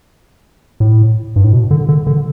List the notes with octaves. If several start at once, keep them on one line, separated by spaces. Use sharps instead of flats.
A2
G2
A2
B2
D3
D3
D3